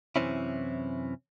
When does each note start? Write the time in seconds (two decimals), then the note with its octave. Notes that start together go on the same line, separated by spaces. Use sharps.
0.16 F#2 C3 E3 C4 C#4 E4